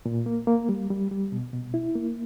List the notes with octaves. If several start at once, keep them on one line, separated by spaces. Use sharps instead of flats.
A#2
A#3
A#3
G3
G3
G3
B2
B2
E4
A#3